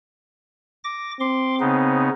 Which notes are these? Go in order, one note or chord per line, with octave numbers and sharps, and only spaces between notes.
D6 A#6
C4 C6 D6
C#3 B3 D#4